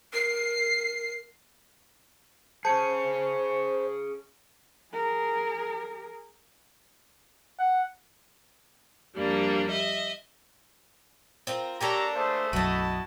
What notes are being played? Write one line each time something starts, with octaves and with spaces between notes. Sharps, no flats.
A#4 C7
G#4 C5 C#5 A5 C#7
G#4 A#4
F#5
F2 G3 A#3 D4
D#5 E5
C4 F4 A#4
A#3 D4 G4 A4 C#5 A#5
A3 G#4 C5
B1 F#2 E4 F#4 B4 D#5 A5